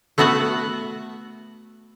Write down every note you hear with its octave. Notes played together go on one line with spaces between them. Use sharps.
A3 B3 F#4 E5 F#5 A5